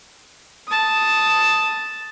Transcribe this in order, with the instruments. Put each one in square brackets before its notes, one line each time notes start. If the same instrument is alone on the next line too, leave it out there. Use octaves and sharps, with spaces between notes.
[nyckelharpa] A5 D#6